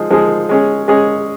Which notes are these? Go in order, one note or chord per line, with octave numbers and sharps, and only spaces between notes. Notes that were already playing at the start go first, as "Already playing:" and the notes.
Already playing: F3 G#3 D#4 G#4
F3 G#3 D#4 G#4
G#3 C#4 G#4
G#3 C#4 G#4